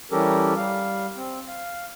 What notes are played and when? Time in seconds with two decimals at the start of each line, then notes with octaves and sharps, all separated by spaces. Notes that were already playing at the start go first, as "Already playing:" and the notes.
0.11 E3 G3 C#4 G4 A4 A#4
0.57 G3 F5
1.16 C4
1.48 F5